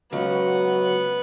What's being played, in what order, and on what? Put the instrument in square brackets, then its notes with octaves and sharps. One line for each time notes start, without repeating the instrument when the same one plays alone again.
[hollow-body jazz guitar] C#2 [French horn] F#3 [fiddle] B3